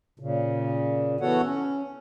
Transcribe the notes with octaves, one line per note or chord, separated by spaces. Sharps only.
A#2 C#3
E3 B3 F#4 A4 C#5 F#5
C#4